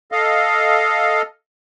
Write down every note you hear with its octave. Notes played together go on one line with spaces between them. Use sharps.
A4 D#5 F5